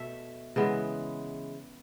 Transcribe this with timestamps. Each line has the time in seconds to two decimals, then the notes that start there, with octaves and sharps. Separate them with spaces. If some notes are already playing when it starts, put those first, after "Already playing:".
Already playing: B2 A3 E5
0.56 C#3 E3 G#3 B3